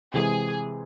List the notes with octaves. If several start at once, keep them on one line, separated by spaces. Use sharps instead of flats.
C3 E3 G#3 C4 G#4